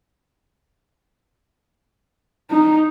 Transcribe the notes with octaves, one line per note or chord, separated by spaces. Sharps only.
D#4